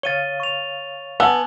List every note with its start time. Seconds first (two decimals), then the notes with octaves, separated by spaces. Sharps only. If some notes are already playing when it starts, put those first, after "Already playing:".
0.03 C#5 F5 A6 D#7 G7
0.40 C#6 F7
1.20 B3 G#5 A5 E6